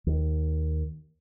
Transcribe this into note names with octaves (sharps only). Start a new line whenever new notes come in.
D#2